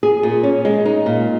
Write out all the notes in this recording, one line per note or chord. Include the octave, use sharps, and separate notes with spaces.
G#4
A#2
C#4
G#3
D#4
A#2